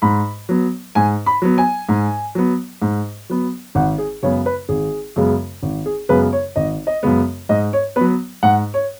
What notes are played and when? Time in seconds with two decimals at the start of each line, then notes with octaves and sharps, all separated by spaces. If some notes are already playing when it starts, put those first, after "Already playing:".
0.02 G#2 B5
0.49 F#3 B3
0.95 G#2 G#5
1.26 B5
1.42 F#3 B3
1.58 G#5
1.89 G#2
2.35 F#3 B3
2.82 G#2
3.29 F#3 B3
3.75 G#1 F#5
3.98 G#4
4.23 F#2 C#3 G#3 B3 C#5
4.46 B4
4.69 G#1 G#4
5.16 F#2 C#3 G#3 B3
5.63 G#1
5.86 G#4
6.09 F#2 C#3 G#3 B3 B4
6.33 C#5
6.56 G#1 D#5
6.87 D#5
7.03 F#2 C#3 G#3 B3
7.49 G#2 D#5
7.73 C#5
7.96 F#3 B3 B4
8.43 G#2 F#5
8.74 C#5